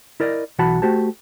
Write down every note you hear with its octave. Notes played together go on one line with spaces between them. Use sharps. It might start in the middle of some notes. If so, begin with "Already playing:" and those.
E4 A#4 D5 D#5
B1 E3 F#4 F#5 A5 B5
A3 F#4 G4 C5 A5